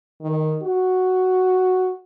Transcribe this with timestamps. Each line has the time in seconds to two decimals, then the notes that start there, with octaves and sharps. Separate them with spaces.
0.21 D#3
0.63 F#4